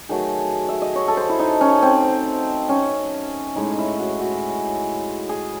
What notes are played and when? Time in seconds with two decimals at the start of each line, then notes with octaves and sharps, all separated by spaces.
0.09 D#3 F#3 A3 G#4
0.69 E5
0.82 D#5
0.96 C#5
1.08 A4
1.17 C5
1.29 E4
1.39 D#4
1.61 C#4
1.82 C4
2.69 C#4
3.56 A2 G#3 D#4
3.78 E4
3.99 F#4
4.20 F#4
5.29 G#4